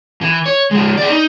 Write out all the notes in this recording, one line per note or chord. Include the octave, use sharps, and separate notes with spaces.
E3
C#5
F3 G#3
G#4 D5
D#4